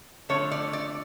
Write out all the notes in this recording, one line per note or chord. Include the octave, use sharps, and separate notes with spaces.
D3 F3 A3 C#5
D5
D5